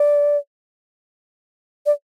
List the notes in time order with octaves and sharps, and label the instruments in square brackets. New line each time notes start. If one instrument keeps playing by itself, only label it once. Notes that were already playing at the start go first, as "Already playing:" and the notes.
Already playing: [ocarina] D5
D5